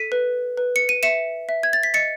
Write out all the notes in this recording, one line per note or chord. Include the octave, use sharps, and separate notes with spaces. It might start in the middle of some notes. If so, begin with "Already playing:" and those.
Already playing: A4 B6 D#7
B4
B4
C#7
D#7
E5 C#7 E7
E5
G#6
A6
B6
D#5 A6 C#7